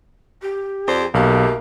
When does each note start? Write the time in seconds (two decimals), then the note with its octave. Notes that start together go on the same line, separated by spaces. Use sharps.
0.42 G4
0.87 F2 C5 D5
1.14 B1 A3 A#3 G4